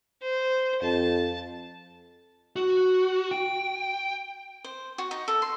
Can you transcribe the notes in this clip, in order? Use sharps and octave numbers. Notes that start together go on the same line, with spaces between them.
C5
F2 A5
F#4
G5
C5
F#4
D#4
A4
C6